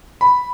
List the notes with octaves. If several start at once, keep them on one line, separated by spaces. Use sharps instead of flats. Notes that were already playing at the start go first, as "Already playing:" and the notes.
B5